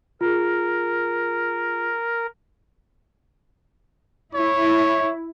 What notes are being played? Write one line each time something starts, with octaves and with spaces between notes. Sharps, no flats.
F4 G#4 A#4
E4 C#5